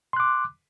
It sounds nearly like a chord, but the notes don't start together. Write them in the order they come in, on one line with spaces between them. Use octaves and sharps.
C6 F#6 D6